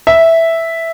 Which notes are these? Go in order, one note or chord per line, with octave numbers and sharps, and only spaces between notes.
E5